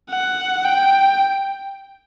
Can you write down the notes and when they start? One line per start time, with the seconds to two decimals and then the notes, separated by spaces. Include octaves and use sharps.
0.11 F#5
0.65 G5